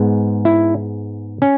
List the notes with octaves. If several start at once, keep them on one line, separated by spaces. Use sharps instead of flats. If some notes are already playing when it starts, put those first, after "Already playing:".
Already playing: G#2 G#3 B3
E4
C#4